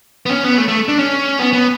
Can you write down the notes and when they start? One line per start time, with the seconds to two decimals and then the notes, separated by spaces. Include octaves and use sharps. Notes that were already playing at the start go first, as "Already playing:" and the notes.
0.26 B3
0.30 C#4
0.44 B3
0.58 A3
0.68 A3
0.89 D4
0.99 C#4
1.39 B3
1.53 B3